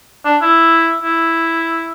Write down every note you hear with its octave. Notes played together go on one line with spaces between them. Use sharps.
D4
E4
E4